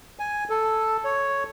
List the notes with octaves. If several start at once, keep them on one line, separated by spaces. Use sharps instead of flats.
G#5
A4
C#5